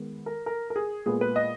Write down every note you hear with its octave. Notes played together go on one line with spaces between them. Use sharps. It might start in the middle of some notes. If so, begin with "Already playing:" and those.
Already playing: D#3 G#3 B3
A#4
A#4
A#4
G#4
A#2 G#3 B3 G#4
B4
D#5